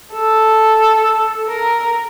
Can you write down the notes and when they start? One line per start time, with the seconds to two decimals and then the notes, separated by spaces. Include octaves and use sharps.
0.13 A4
1.49 A#4